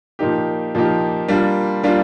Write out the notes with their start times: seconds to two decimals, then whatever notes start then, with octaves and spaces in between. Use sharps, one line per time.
0.19 A#2 F3 A#3 D#4 G4
0.75 A#2 F3 A#3 D#4 G4
1.28 G3 A#3 D4 F4
1.83 G3 A#3 D4 F4